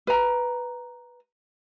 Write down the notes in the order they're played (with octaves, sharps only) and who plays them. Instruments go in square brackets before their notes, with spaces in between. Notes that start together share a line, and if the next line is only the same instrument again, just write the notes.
[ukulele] B4 A#5